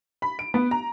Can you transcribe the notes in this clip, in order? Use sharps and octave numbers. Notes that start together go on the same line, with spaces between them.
B5
D7
B3
A#5